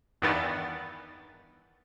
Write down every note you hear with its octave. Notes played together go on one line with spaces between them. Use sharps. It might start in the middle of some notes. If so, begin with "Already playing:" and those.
E2 G2 D#3 E3 B3 A6